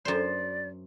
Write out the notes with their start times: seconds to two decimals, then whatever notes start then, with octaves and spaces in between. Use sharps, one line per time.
0.05 F#2 C5 D5